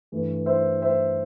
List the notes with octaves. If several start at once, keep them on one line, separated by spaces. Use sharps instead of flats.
G2 E3 A3
C5 E5
C5 E5